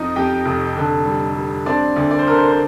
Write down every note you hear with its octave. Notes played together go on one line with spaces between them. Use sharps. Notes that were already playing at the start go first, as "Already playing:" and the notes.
Already playing: F2 F3 D#4 D#5
F2 G4 G5
F1
D3
G3
G3
C4 D4 D5
D2
D5
C5
D3 A#4
C5
C5